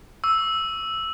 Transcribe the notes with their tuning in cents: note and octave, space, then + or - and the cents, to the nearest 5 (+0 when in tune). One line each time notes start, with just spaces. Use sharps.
C#6 +45 E6 +0